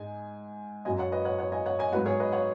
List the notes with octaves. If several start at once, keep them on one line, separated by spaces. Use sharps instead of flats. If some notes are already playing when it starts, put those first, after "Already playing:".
Already playing: G#2 G#3 D#5 G#5
F#2 F#3 D#5 G#5
C#5 F#5
B4 D#5
C#5 F#5
C#5 F#5
D#5 G#5
C#5 F#5
D#5 G#5
G#2 F#3 F#4 B4
G#4 C#5
B4 D#5
C#5 F#5